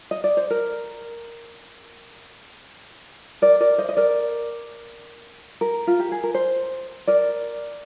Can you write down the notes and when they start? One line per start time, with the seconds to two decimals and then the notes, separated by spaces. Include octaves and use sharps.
0.11 D#5
0.24 D5
0.37 C5
0.50 A#4
3.42 A#4 D5
3.60 A#4 D5
3.78 C5 D#5
3.89 D#5
3.97 A#4 D5
5.61 A#4
5.87 F4
5.99 G4
6.12 G#4
6.24 A#4
6.34 C5
7.07 A#4 D5